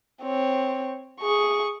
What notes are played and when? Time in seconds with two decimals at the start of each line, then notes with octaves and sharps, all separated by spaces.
0.23 C4 C#5
1.21 G#4 C#6